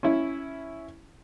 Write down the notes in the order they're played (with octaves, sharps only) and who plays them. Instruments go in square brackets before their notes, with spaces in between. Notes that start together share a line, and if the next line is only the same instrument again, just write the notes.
[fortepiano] C#4 E4